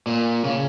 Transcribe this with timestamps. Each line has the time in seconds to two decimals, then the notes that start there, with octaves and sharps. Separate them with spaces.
0.07 A#2
0.44 C#3